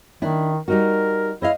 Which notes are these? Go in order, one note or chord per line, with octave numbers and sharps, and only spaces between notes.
D#3 D4 E4
G3 D#4 F#4 A#4
E4 C5 D#5 F5